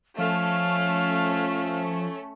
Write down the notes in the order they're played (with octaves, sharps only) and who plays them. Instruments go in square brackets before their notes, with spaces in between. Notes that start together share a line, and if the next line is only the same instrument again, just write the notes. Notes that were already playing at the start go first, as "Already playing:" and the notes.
[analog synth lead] F3 [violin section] A3 C#4 [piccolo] F5